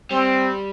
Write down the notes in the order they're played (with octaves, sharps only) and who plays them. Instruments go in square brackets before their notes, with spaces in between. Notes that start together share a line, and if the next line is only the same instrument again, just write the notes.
[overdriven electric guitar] G3 [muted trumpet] C4